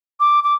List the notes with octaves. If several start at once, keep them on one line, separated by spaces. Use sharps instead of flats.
D6
D6